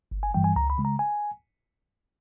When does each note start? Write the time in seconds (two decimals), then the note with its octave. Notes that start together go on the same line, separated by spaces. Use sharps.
0.12 G1
0.23 G#5
0.34 G2 E3 G3 G5
0.44 G#5
0.56 C#2 A#5
0.70 B5
0.78 C#3 G#3
0.85 A#5
0.99 G#5